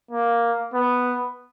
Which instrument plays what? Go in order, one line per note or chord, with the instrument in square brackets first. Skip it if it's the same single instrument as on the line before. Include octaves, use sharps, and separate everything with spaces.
[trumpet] A#3
B3